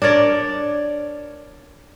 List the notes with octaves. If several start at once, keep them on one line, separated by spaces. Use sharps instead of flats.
D4 A#4 C#5 D5